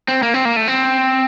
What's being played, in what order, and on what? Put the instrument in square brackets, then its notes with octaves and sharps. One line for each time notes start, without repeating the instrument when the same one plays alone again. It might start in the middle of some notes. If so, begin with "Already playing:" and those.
[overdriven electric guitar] C4
A#3
C4
A#3
A3
C4